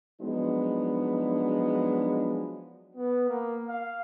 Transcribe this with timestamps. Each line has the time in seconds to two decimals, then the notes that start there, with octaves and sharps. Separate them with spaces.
0.21 F3 F#3 G#3 B3 D4 D#4
2.95 B3
3.29 A#3
3.68 F5